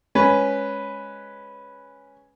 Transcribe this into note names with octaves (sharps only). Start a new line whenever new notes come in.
G#3 C#4 B4